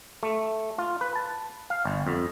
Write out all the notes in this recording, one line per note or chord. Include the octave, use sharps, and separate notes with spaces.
A3
F4
B4
A5
F5
G1
F2